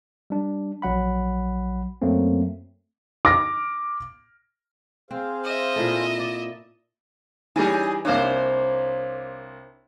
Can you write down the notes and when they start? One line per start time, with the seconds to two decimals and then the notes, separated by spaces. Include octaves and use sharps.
0.30 G3 D4
0.82 A#1 F#3 F#5 B5
2.02 F#2 F#3 A3 A#3 C4
3.25 D6 F6 A#6
5.11 C4 G#4 C5 F5
5.44 D#5 E5
5.76 A#2 E4 A4
6.19 D5
7.56 E3 G3 C#4 D#4 G#4
8.05 C2 A#3 D4 C5 C#5